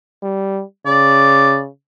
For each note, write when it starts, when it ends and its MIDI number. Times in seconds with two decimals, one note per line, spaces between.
0.23 0.63 55
0.86 1.68 49
0.86 1.57 74